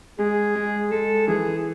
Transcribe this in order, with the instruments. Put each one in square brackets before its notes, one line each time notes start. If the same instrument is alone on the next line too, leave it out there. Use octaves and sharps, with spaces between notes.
[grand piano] G#3 [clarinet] G#4
[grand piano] G#3
[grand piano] G#3 [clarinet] A4
[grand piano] E3 [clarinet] G#4